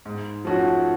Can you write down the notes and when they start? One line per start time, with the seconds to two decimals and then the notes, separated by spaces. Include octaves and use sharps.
0.05 G#2
0.45 F3 A3 C#4 F#4